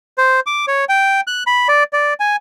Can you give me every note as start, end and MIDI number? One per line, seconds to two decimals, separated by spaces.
0.18 0.40 72
0.46 0.65 86
0.68 0.85 73
0.89 1.21 79
1.27 1.43 90
1.47 1.68 83
1.69 1.83 74
1.93 2.14 74
2.20 2.36 80